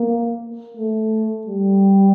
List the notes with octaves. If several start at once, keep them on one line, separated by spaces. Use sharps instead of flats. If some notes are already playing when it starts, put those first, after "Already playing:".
Already playing: A#3
A3
G3